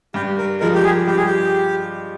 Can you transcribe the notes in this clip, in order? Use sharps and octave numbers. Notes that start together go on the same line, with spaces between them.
G2 G4
A#4
F3 G#3 A#4
G4
G#4
G2 G4
G#4
G4